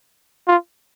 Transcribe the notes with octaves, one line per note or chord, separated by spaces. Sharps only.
F4